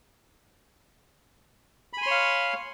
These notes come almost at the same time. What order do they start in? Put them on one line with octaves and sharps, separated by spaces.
B5 G#5 C6 C#5 F5